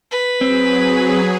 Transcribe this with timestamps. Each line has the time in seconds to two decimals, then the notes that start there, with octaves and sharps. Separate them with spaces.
0.11 B4
0.41 F#3 C4 G#4